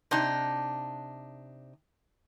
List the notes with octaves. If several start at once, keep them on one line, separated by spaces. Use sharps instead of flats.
C3 D4 D#4